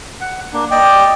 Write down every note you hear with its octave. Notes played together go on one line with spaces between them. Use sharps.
F#5
A#3 D4
D5 D#5 G5